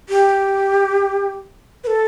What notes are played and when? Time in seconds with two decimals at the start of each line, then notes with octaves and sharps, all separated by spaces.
0.09 G4
1.84 B4
1.87 A4